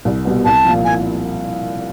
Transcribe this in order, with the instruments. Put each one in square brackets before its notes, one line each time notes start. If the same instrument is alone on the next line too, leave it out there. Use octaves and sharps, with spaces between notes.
[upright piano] C2
B2 G3 B3
[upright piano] C2 [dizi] A5
[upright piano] A#2 F3
[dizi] G#5